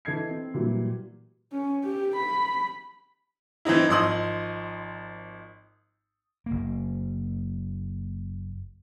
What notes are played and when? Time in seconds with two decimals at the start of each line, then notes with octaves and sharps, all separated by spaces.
0.05 E3 A4 D#5 G#6 C7
0.29 C4
0.54 A#2 E3 F#3 G3
1.52 C#4
1.84 G4
2.16 B5
3.65 E3 C4 D#4 E4
3.89 G#1 F3 D#5 C6 D#6 F#7
6.46 F#1 A#3